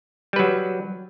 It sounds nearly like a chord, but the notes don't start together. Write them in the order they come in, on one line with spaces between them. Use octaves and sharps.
G3 B4 F#3